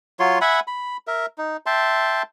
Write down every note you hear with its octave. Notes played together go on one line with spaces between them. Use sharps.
F#3 F4 C#5 C6
E5 F#5 G#5 B5
B5
A#4 E5
D#4
E5 G5 A5 C6